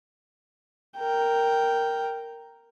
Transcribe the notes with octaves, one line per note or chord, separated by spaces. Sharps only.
A#4 G5